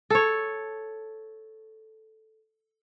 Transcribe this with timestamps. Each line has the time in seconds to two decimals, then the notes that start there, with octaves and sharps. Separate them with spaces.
0.10 A4 C#5